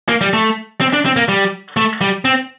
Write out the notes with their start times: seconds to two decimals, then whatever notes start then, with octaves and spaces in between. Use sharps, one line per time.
0.08 A#3
0.21 G3
0.33 A3
0.81 C4
0.93 D4
1.05 C4
1.16 A#3
1.29 G3
1.77 A3
2.01 G3
2.25 C4